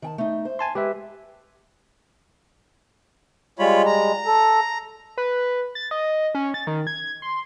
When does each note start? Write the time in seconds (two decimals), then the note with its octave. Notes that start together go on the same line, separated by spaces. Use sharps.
0.02 D#3 G5 A5
0.18 A3 D#4
0.45 C5
0.59 G#5 A5 C6
0.75 G#3 G4 B4 E5
3.59 G3 G#3 F4 C#5 B5
3.86 A#5
4.26 A4
5.17 B4
5.75 A6
5.91 D#5
6.35 C#4
6.54 A6
6.67 D#3
6.87 G#6
7.22 C6